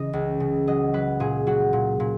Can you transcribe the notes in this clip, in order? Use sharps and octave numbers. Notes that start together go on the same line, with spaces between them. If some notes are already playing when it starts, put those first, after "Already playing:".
Already playing: C#3 E3 D#5
C#2
C#3
F#3 D#5
F#3 B4
A#2 G#4
F#3 F#4
A#2
A#2